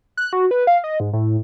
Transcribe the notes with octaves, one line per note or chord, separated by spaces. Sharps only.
F#6
F#4
B4
F5
D#5
G#2
A2